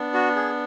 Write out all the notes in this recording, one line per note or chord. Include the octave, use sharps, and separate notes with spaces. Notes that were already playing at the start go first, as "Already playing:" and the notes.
Already playing: B3 D4
F#4
G#4